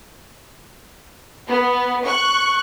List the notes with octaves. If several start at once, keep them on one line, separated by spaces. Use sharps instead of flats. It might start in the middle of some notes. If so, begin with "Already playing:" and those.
B3
C#6 F#6